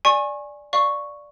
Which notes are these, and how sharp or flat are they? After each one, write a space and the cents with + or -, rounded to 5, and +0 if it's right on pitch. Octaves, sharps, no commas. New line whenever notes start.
D5 +0 G#5 +0 C#6 -30
D5 +0 F5 -5 C#6 +0